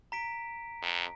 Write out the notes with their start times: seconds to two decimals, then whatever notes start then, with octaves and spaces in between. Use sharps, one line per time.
0.12 A#5 B6 D7
0.82 F2